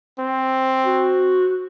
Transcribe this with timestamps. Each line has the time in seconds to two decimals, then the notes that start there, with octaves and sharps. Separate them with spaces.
0.19 C4
0.85 F#4